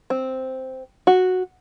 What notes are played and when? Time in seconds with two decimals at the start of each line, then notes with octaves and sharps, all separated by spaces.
0.10 C4
1.07 F#4